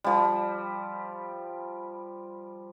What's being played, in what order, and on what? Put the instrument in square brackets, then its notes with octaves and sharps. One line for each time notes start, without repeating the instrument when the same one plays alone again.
[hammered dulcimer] F3 G3